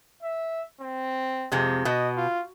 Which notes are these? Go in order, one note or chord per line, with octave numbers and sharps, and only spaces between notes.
E5
C4
F2 C3 G#3
B2 D#5
F4